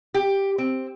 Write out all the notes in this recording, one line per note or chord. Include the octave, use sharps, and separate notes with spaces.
G4
C4